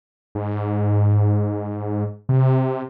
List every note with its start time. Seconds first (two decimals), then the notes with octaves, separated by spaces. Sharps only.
0.35 G#2
2.29 C3